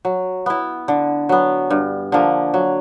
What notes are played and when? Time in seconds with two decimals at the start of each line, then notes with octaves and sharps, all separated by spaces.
0.05 F#3
0.46 B3 E4
0.88 D3
1.29 F#3 B3
1.70 G2
2.12 D3 F3 A#3
2.54 F#3